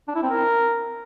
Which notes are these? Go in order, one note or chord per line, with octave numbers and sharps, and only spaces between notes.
D4
E4
C4
A#4